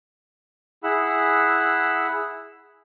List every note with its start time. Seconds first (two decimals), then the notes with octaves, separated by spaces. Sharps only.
0.84 E4 G#4 F#5 B5 E6